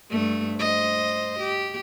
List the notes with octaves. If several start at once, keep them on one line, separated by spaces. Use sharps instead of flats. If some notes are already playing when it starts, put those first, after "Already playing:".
G2 A3
C5 D#5
G4